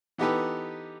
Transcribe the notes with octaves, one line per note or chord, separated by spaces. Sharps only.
E3 B3 D#4 G4 A4 B4